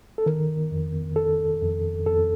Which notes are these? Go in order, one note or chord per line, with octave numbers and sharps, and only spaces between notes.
A4
D#3 A#4
F2
F2 A4
F2
F2 A4